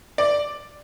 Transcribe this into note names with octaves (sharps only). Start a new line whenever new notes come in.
D5